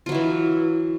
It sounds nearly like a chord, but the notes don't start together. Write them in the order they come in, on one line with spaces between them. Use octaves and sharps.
F4 F#3 E4 E3